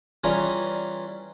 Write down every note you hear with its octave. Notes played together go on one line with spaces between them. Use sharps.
E3 G3 C#4 F4 G#4 A#5